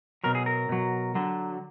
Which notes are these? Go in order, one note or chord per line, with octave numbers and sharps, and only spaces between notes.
B2 F#3 A#4
G#4
A#4
B2 F#3
D3 F#3